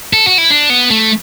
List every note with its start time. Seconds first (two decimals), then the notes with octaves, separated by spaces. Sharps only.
0.13 A4
0.26 F#4
0.38 E4
0.51 D4
0.70 B3
0.90 A3